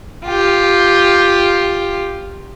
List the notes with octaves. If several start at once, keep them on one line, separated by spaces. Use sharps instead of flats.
F4 G4